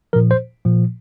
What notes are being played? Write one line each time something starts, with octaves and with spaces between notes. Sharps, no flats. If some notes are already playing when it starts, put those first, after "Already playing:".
A#2 F3 A#4
C5
A#2 F3